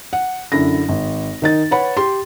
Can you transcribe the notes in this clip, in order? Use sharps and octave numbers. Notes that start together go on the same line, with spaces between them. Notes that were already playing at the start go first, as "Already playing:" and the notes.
F#5
F#2 D3 E4 A#6
G#1
D#3 D#4 A6
B4 C#5 F#5 B5
G4 C6